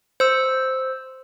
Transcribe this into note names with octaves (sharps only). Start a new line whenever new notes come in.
C5 E6